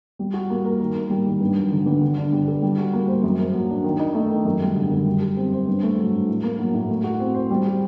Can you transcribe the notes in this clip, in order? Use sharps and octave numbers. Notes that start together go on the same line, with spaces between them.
G3
F#4
A#3
A#4
D#3
A#3
G3
D#3
G2
F#3
D3
G2
D3
D4
G3
A4
G3
F#4
A#3
C5
F#2
A#3
F#3
D4
D#3
D#4
A3
D#3
F#2
G3
D3
F#2
G3
G4
C4
C5
G2
A3
F#3
G2
A2
A#3
F#3
A2
A3
F#4
C4
C5
G3
G4